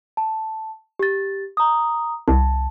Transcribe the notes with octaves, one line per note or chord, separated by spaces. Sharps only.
A5
G4 A6
A#5 D#6
C2 A5